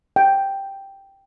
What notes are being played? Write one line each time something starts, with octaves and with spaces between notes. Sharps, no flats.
G5